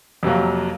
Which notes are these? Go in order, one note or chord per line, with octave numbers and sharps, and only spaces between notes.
F2 C3 F#3 A#3